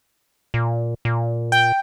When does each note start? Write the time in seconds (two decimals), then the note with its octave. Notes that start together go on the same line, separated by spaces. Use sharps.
0.54 A#2
1.05 A#2
1.52 G5